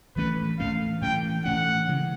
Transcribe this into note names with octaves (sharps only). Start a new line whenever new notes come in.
A2 E3 A3 C#4 B4
A2 E3 A3 C#4 F5
A2 E3 A3 C#4 G5
A2 E3 A3 C#4 F#5
C#3 E3 G#3